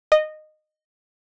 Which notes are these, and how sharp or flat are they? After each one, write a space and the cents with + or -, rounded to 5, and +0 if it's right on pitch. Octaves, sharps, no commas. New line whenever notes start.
D#5 -15